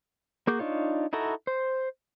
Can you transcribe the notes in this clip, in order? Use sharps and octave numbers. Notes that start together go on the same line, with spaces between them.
A#3 F#4 G#4 D6 G6
D4 D#4 F4 C#5
D#4 E4 F#4 A4 A#5
C5